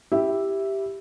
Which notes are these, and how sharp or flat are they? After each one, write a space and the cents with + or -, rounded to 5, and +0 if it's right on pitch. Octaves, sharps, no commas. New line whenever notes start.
E4 +0 G4 +0 E5 +0